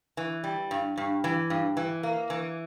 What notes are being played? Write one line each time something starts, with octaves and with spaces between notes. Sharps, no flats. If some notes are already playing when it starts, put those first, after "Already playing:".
E3
G3
G2
G2
E3
G2
E3
A#3
E3